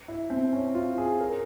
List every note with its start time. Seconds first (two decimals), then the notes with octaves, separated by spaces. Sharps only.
0.08 E4
0.30 C4
0.53 C#4
0.75 F4
0.98 G#4
1.21 A#4